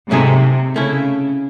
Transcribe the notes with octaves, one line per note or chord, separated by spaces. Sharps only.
G#2 C3 F#3 A3 D#4 G#4
C#3 A3 C#4 E4